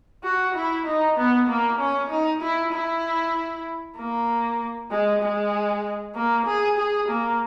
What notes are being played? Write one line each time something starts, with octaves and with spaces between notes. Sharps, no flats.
F#4
E4
D#4
B3
A#3
C#4
D#4
E4
E4
A#3
G#3
G#3
A#3
G#4
G#4
A#3